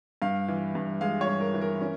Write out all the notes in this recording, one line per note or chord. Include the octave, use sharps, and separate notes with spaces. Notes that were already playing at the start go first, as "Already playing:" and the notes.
G2 F5
E3
G2
G#3 F5
C#5
G2
A#4
E3
A#4
C#4